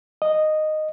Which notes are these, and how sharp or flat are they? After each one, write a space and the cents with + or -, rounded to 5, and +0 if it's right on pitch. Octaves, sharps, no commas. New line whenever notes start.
D#5 -10